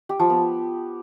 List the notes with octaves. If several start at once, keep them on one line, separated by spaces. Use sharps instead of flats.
G4
F3
B3